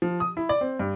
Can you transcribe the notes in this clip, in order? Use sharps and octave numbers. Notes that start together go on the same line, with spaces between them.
F3
D#6
E4
D5
C4
G2